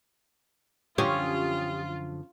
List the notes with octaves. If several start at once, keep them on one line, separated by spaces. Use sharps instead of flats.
F#2 D3 F3 C#4 F4 G4 C6 D#6